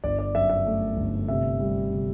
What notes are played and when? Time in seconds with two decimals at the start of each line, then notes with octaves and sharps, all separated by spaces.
0.03 G1 D5
0.19 D5
0.35 F#2 E5
0.50 E5
0.66 A3
0.97 G1
1.28 C3 E5
1.60 G3
1.91 C3